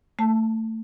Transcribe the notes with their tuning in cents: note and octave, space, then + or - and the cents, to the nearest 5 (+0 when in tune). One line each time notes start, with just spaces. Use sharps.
A3 +20 A5 +0